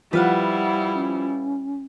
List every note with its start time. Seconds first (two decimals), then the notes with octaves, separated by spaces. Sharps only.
0.13 F3 G3 E4 B4 F5 F#5
0.95 C#4